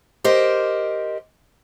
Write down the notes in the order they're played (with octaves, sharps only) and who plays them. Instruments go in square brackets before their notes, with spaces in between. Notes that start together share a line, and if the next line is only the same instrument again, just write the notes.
[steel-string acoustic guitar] G4 A#4 C5 D#5